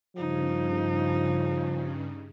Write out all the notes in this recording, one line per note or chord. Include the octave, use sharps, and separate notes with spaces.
G2 C#3 F3 D#4